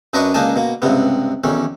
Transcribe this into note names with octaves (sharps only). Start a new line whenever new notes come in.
F#2 D4 A#4 B4 D#5 C#6
C#2 A#3 D4 D#4 G#5 A5
B2 A#3
C#2 G2 C3 B3
B1 E2 D#3 C#4